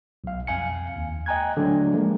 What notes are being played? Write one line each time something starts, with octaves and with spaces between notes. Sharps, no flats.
B1 F5
F2 F5 G#5 C#7
D#2
D#5 G5 G#5 A#5 F#6 G#6
D3 F#3 A3 D4
F3 G#3 A#3